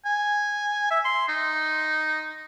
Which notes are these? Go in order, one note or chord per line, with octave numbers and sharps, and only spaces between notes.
G#5
E5
C6
D#4